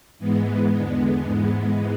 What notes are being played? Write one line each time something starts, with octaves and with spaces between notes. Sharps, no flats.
G#2 E3 G#3 B3
E2 D3 G#3
G#2 E3 G#3